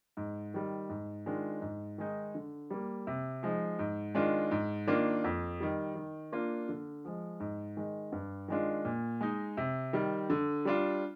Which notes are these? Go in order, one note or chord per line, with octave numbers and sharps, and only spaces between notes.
G#2
D#3 G3
G#2
D#3 G#3 D4 F4
G#2
D#3 G#3 D#4
D3
G3 A#3
C3
F3 G#3 D#4
G#2
D#3 G#3 D4 F4
G#2
D#3 A#3 D4 F4
F2
D#3 G3
D#3
A#3 D4 F4
D3
F3 G#3
G#2
D#3 G#3
G2
D#3 G#3 D4 F4
A#2
G#3 D#4
C3
D#3 G3
D3
G3 D4 F4